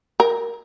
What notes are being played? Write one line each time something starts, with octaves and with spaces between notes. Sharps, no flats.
A#4